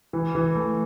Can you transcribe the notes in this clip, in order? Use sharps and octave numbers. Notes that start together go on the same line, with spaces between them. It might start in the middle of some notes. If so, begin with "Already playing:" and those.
E3
E3
A3